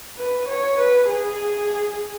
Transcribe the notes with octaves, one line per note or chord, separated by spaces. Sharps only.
B4
C#5
B4
G#4